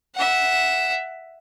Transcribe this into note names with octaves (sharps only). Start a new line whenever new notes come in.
E5 F#5